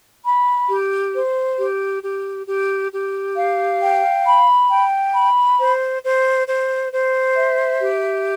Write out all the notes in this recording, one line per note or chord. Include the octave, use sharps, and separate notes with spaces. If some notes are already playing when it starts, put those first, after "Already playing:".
B5
G4
C5
G4
G4
G4
G4
F5
G5
B5
G5
B5
C5
C5
C5
C5
E5
G4